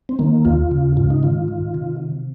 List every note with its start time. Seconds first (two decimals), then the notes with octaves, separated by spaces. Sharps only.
0.09 C4
0.19 D#3 A#3
0.45 D#2 F4
0.71 C#3
0.97 G#2 F4
1.10 D#4
1.23 D#3 F4
1.48 D#3
1.74 C3